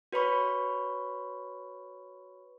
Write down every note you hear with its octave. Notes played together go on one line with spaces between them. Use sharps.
F#4 B4 C#5 B5 C#6